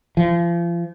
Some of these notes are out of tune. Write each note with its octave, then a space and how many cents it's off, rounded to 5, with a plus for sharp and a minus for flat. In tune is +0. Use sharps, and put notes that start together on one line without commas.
F3 -35